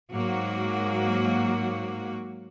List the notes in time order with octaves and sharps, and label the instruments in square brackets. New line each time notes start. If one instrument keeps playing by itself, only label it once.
[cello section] G#2 F#3 A#3 F#4